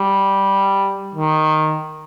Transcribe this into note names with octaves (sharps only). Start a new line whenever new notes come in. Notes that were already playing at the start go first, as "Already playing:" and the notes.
Already playing: G3
D#3